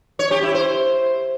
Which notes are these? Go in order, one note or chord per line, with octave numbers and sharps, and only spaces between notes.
C#5
G4
E4
C5